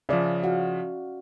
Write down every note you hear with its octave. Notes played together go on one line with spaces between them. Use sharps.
C#3 F3 C#4 D5 E5
F#4 F5 F#5